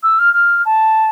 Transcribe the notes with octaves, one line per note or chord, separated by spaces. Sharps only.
E6
F6
F6
A5